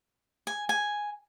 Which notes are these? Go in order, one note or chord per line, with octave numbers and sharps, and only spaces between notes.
G#5
G#5